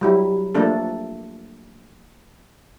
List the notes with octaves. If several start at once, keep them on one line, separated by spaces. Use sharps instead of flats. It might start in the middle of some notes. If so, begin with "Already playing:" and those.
F#3 G3 E4
F3 A3 A#3 D4 A4